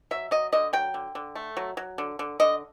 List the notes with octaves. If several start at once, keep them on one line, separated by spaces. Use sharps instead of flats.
F#3 E5
F#3 D#5
D3 D#5
F#3 G5
D3
D3
A3
F#3
F#3
D3
D3
D3 D#5